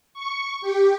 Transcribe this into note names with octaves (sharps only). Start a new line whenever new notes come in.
C#6
G4